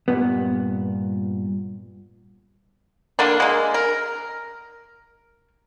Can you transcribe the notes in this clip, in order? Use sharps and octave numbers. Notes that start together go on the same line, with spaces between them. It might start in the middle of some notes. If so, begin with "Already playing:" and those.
G2 A#2 B3
D3 A#3 D4
G#3 A#3
A#4